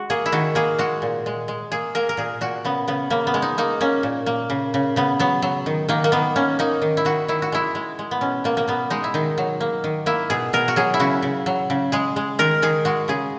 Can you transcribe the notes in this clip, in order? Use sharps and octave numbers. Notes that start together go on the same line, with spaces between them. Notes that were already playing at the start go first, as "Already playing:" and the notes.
Already playing: G#3 F#4
A#3 G#4
E4
D#3 F#4
A#3 G#4
G#3 F#4
A#2
G#3
G#3
A#3 G#4
A#3 A#4
A#4
A#2 G#4
A#2 F#4
C#3 B3
C#3 B3
C#3 A#3
B3
G#3
D#4
A#3 D#4
A#3 C#4
A#2
A#3
C#3
C#3
C#3 B3
F#3 B3
F#3
D#3
D#3 A#3
A#3
D#3 B3
A#3 C#4
A#3 D#4
D#3
E4
D#3 F#4
D#3 E4
F#4
G#3 E4
G#3
G#3
B3
B2 C#4
B2 A#3
A#3
B2 B3
G#3 D#4
E4
D#3 D#4
F#3
A#3
D#3
A#3 E4
B2 G#4
B2 A#4
F#4
F#3 G#4
E4
C#3 F#4
C#3
F#3
C#3
G#3 G#4
G#3
D#3 A#4
D#3 G#4
G#3 F#4
C#3 G#4